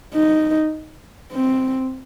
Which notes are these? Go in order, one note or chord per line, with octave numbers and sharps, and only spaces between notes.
D#4
C4